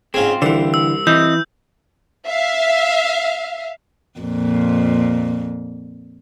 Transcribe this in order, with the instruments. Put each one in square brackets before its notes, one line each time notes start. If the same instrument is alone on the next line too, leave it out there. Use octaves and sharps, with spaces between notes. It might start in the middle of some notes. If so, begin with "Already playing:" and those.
[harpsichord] G#2 C#4 G#4 [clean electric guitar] C4 F4
[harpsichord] C2 C5 [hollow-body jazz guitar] D3 E3
[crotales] E6
[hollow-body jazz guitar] E3 [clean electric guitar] C4 D#5 [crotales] G6
[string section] E5 F5
[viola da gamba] F2 A#2